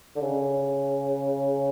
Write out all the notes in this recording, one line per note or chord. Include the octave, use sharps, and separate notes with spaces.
D3
C#3